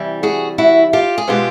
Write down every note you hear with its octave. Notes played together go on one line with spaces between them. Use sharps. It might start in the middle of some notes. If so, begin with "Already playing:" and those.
Already playing: C3 E3 G3
F#4 G#4
E4 F#4
F4 G4
G#4
B2 G#3 B3 F4 G4